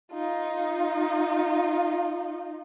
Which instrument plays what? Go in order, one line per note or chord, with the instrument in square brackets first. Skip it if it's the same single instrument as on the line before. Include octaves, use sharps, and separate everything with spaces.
[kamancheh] D#4 F4